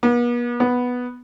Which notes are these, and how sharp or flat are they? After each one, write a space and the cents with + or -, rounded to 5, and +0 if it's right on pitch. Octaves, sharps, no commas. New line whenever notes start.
B3 -40
B3 +0